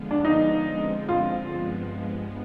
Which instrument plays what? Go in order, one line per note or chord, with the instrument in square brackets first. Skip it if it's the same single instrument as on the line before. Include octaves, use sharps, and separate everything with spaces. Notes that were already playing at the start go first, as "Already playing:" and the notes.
Already playing: [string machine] D3 F3 G#3 B3 F4
[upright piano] D4
D#4
[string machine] D3 F3 G#3 C4
[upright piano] F4
[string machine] G2 F3 G#3 B3